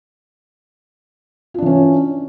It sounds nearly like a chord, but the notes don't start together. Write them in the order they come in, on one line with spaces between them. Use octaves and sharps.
F4 D4 E3 C#4